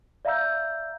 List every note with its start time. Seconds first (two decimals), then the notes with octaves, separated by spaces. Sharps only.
0.25 D5 E5 F5 A#5 E6 G6